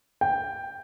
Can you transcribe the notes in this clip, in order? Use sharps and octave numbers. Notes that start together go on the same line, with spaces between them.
G5